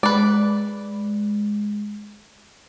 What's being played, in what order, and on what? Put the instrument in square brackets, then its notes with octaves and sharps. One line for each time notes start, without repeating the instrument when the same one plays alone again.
[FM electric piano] G#3 [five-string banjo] B4 D5